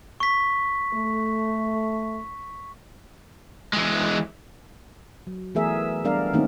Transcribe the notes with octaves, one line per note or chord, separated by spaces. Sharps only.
C#6 B6
A3
E3 G#3
F#3
E3 A3 B3 G#4 A#4 E5
G3 B3 D4 A#4 D5 F5
D#3 A3 A#3 C4 C#4 D#4